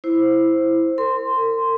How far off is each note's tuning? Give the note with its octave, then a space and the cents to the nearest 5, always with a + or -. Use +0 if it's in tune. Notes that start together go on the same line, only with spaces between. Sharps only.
E4 +0 C5 +0
A#4 -40 C6 -10